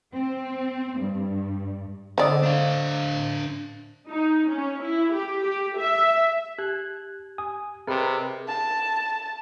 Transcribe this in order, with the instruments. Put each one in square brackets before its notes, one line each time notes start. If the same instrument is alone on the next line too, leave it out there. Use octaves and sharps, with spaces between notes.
[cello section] C4
G2
[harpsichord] D3 [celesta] C5 D#5 D#6 [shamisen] D5 F#5
[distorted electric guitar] D4 F5
[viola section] D#4
C#4
E4
G4
G4
E5
[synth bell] G4 [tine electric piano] F#6
[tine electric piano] G#5 D#6
[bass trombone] C3 [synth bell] G#4 B5 [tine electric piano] A#4 B4 D#5
[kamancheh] A5